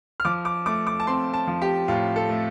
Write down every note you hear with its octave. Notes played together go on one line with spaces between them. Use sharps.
F6
F3 D6
D6
A3 D6
D6
A5
C4 C6
A5
F3
G4
A2 F4
A4
A3